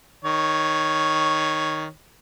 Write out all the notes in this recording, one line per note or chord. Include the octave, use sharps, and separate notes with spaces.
D#3 C#5